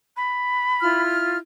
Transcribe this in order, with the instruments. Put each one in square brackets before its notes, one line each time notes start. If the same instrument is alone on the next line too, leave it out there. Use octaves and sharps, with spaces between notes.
[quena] B5
[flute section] E4 F4 F6